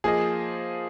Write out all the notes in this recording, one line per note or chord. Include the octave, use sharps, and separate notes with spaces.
F3 A#3 F4 G#4 C5 D#5